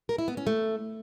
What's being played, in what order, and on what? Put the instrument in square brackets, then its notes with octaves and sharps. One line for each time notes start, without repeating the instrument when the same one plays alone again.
[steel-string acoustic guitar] A#4
E4
B3
C#4
A3